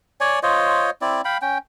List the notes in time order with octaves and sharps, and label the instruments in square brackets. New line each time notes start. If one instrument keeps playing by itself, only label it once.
[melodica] C#5 D5 G#5
F4 C5 C#5 D#5
C4 E4 D5
F5 G5 B5
C#4 G5